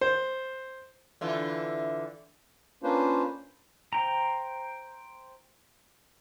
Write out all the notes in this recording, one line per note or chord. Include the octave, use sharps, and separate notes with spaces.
C5
D3 E3 F4
A#3 C#4 D4 F4 B4 C5
C5 G5 A#5